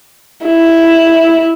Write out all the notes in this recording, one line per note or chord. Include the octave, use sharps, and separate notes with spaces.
E4